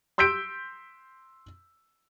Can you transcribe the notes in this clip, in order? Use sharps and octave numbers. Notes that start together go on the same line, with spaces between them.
C6 E6 G6 B6 D7